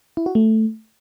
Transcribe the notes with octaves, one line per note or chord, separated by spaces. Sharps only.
E4
F#4
A3